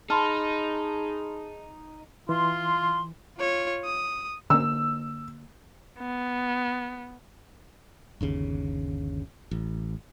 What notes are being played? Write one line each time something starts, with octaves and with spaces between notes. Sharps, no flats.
D#4 G#4 A5 B5 C6 F6
E3 F4 C6
F4 C#5
D#6
D3 A#3 E6
B3
G1 D#2 C#3
A1